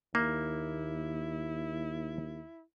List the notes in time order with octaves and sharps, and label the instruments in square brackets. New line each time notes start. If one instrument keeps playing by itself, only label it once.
[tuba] D#2 [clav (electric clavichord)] A#3 [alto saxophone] E4